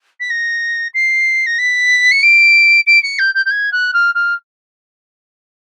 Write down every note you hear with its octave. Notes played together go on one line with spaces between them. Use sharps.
B6
A#6
C7
A#6
B6
C#7
D7
D7
C#7
G6
G6
G6
G#6
F#6
F6
F6